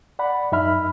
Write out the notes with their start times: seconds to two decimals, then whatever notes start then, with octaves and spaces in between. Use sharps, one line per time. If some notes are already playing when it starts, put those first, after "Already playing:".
0.19 D5 F#5 B5
0.52 F#2 D#4 E5 B5 F6